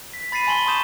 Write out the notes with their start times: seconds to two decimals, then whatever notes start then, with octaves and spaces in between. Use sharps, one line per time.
0.14 B6
0.32 B5 A6 B6 C7 D#7
0.47 G#5 A5 C6 F#7 G7
0.66 C6 C#6 D#6 G6 E7 F#7